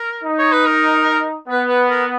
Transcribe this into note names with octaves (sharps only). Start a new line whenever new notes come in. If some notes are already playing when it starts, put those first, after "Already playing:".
Already playing: A#4
D#4
C#5
B4
A#4
B3 B4
B4
A#4